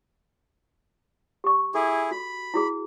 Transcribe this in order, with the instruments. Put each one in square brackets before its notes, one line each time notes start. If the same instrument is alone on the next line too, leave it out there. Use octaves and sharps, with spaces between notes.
[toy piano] G4 C#6
[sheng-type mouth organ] E4 G#4 [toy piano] A4
[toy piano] F#4 [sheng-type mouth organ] B5
[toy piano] E4 F#4 G#4